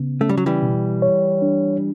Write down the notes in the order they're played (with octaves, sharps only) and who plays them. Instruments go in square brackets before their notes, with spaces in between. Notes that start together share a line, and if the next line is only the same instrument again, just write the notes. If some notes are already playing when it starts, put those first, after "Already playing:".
Already playing: [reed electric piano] C#3 B3
[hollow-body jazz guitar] A3 [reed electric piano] C#4
[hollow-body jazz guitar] G3
F#3
E3 G3
[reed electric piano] B2
C#5
D4